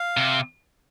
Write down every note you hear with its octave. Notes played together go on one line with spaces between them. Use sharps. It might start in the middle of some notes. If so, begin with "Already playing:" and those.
Already playing: F5
C3